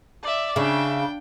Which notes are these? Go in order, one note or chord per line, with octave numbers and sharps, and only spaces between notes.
D5 E5
C#3 D4 E5 G5